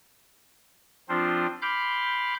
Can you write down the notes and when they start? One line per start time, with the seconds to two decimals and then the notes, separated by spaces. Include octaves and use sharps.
1.09 F3 C4 D4 F4 C5
1.62 B5 C6 D6 F6 G6